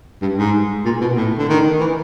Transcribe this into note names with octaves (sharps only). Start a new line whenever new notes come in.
G2
G#2
A#2
B2
A2
D3
D#3
E3